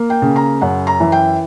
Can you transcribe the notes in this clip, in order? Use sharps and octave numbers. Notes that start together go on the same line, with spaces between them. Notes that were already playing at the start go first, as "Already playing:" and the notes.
Already playing: A#3
G5
C#3
A#5
F#2 F#5
A#5
E3
G5